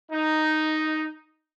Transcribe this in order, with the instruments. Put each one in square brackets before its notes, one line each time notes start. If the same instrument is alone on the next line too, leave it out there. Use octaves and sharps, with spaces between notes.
[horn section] D#4